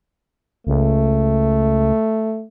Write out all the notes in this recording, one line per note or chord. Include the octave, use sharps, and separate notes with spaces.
C#2 A3